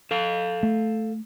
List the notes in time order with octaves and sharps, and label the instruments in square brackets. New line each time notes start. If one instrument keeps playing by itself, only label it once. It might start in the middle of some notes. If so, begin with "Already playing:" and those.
[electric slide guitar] A4 F5
[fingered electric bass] A3